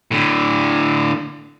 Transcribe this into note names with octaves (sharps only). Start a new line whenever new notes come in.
A2 D3